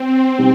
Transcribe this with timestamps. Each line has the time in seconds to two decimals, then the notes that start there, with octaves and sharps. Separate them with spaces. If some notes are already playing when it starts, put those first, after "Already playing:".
Already playing: C4
0.38 B2 G3 B3 D#4 G4